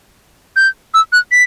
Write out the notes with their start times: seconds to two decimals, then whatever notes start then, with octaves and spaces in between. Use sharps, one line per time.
0.56 G6
0.94 E6
1.12 F#6
1.31 B6